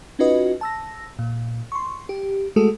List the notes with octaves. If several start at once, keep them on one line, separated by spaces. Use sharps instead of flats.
C#4 D#4 F4 F#4 B4 D#5
A5 E6 A#6
A#2
C6 C#6
G4
G#3 A3 F#4 G#4 A4